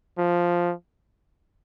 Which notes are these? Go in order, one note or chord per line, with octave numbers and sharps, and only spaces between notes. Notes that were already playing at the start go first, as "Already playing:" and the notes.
F3